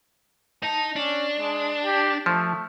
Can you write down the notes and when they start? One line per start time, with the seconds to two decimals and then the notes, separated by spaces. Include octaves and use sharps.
0.63 D#4 A5
0.96 C#4 D4
1.39 G#3
1.85 G4
2.26 F3 A3